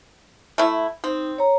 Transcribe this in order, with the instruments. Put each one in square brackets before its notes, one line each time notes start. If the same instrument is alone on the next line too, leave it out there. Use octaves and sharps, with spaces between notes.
[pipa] A3 E4
[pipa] C4 [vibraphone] D#4
[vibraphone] C#5 A#5